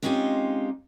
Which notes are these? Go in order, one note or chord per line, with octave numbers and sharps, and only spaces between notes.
G#3 C4 C#4 D#4 F4 G4